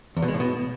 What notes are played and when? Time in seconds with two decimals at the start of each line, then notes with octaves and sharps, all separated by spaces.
0.17 E2
0.22 B2
0.28 G#3
0.34 A2
0.40 B2